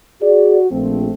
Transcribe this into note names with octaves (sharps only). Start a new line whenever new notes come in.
F#4 G#4 D5
A#1 F3 A3 C4